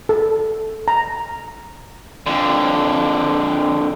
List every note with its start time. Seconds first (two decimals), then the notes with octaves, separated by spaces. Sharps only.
0.09 A4
0.88 A#5
2.27 F2 D3